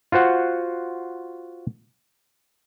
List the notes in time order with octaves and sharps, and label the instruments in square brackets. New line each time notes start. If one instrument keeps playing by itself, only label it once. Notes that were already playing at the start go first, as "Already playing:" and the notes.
[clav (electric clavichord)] F4 F#4 C5 F#5